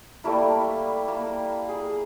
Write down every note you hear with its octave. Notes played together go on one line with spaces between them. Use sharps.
G3 A3 A#3 E4
A#3
G#4